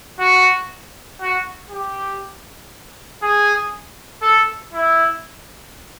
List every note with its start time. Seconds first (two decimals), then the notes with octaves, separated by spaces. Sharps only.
0.20 F#4
1.21 F#4
1.71 G4
3.23 G#4
4.23 A4
4.74 E4